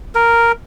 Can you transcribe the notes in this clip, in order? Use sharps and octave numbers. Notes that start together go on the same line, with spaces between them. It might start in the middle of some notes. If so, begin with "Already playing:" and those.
A#4